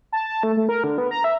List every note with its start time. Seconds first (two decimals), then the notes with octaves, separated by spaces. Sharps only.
0.12 A5
0.28 A5
0.43 A3
0.57 A3
0.69 A#4
0.84 D3
0.98 B3
1.11 A#5
1.24 E5